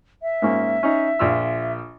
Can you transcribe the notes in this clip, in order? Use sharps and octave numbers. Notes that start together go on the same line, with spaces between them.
E5
G#2 A#3 C#4
C#4 D#4
A#1 F4 E6